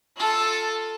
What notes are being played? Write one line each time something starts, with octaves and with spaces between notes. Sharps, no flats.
F4 A4